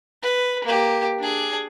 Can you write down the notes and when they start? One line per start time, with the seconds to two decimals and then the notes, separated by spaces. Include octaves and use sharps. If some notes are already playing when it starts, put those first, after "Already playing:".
0.22 B4
0.64 A#3 G4
1.19 D4 G#4